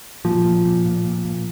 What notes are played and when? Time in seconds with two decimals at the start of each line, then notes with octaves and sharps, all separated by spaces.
0.25 A#2 F3
0.45 A#2
0.65 A#2
0.85 A#2
1.04 A#2
1.25 A#2